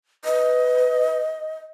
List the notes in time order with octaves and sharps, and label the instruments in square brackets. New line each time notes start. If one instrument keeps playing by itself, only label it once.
[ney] B4 [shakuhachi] D#5